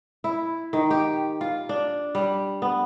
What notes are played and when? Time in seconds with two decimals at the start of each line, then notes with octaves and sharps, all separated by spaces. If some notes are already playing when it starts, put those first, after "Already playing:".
0.24 E4
0.73 D#3
0.91 G4
1.41 F4
1.69 D4
2.15 G3
2.62 B3